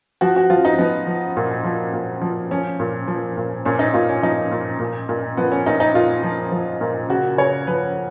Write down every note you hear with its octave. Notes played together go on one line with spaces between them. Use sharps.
F3 F#4
F#4
F3 F4
D#4
F3 B3
F3
A#2
F3
A#2
F3
F3 C#4
A#2
F3
A#2
A#2 C#4
D#4
A#2 F4
C#4
F3 D#4
A#2
A#2
A#2
F3 B3
C#4
A#2 D#4
D#4
A#2 F4
F3
F3
A#2
C#3 F#4
C#3 C#5
F3 B4